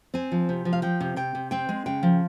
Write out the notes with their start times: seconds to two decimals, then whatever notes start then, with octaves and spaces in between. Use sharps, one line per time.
0.14 C4 G#5
0.32 F3
0.49 C3
0.65 F3
0.73 F5
0.82 F3 G5
1.00 C3
1.16 C3 G5
1.35 C3
1.51 C4 G5
1.69 G#3
1.86 C#3 G5
2.03 F3